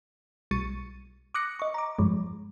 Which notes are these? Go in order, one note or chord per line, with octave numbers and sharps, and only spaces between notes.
B1 G3 C#6 A6 C#7 D#7
D6 D#6 F#6 A#6 C#7
D#5 C#6
A#5 D6
G2 F3 G3 G#3